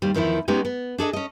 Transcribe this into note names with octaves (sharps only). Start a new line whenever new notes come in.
D#2 G3 C5
E2 D#3 F3 E4
G#3 B3 C#4 D#4 G4
B3
D4 G#4 A4 D#5
C#4 D#5